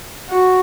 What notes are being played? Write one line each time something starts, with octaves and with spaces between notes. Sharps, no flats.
F#4